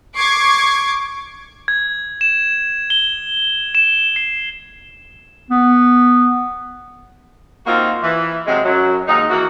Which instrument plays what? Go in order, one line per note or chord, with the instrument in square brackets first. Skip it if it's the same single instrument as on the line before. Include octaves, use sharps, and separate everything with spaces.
[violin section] C#6 D6 G#6 C7
[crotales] G#6
E7
G7
E7
C7
[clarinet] B3
[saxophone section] A#3 C4 D#4 F4 F#4
E3
C3 F#3 G#3
F#2 F#3
D#2 G#2 D#4
E3 A#3 F#4